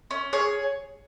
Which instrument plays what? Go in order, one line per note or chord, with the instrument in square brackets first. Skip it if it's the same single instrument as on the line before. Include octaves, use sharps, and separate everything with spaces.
[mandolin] C#4
G#4 C#5